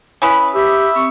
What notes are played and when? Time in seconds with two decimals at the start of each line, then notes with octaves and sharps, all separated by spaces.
0.22 C#4 E4 B4 B5 D#6
0.55 G4 E5
0.95 C4 C#6